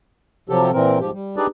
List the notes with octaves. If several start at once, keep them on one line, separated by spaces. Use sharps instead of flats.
C3 F3 F#3 G4 A4
A#2 E3 C4 A#4
G#2 F3 G4
G3
D4 D#4 G4 G#4 B4 D5